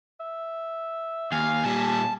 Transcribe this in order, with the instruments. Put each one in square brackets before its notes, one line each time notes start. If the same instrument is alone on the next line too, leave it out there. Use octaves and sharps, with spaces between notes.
[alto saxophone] E5
[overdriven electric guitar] D#2 [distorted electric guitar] F5 [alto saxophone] G#5
[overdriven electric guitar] A#2 G3 [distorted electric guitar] A5